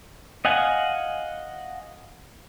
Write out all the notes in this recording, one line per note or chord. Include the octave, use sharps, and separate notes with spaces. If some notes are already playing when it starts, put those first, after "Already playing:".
D#5 F5 F#5 G#5